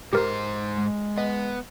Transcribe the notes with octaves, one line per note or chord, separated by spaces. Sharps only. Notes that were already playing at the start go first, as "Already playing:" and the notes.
G#2 G4 A#4 C5
G#3
B3 D#5